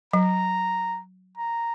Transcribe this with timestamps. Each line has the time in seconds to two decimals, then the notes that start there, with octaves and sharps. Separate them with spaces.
0.13 F#3 A#5
1.37 A#5